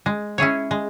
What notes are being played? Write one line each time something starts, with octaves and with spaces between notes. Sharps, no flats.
G#3
C#4 E4 G#4 C#5
G#3